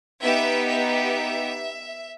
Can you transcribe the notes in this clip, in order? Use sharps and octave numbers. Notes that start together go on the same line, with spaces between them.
B3 D#4 G4 E5
E5